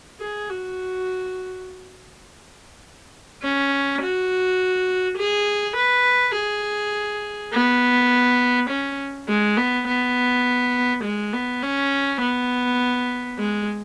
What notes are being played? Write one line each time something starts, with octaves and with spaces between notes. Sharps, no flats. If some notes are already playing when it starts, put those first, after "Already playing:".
G#4
F#4
C#4
F#4
G#4
B4
G#4
B3
C#4
G#3
B3
B3
G#3
B3
C#4
B3
G#3